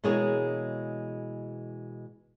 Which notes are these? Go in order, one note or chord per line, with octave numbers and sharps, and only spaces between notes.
B2 E3 G#3 A#3 G#4 C#5